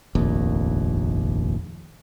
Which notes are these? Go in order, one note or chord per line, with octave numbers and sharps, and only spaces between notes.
F1 A#1 D#2